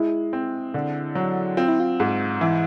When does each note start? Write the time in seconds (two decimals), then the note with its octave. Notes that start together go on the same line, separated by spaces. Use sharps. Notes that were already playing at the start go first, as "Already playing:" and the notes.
Already playing: G#3 E4
0.33 C4
0.74 D3
1.15 F#3
1.57 C4 F4
1.68 E4
1.80 F4
2.00 G#2
2.41 E3 E4